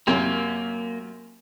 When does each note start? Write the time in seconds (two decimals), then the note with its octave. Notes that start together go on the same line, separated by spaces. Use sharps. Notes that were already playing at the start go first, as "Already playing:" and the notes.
0.07 F#2 C3 A#3